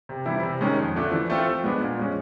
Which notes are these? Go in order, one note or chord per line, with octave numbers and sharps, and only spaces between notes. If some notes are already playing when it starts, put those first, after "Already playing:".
C3
E3 G3 C4 E4
C3
D#3 G#3 C#4
F2
D3 F3 A3 D4
E3
A3 C4 F4 A4
F3
G#3 B3 D4
A#2
F3 G#3 C#4